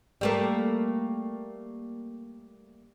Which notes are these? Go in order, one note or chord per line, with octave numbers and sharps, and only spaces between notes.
G3 A3 A#3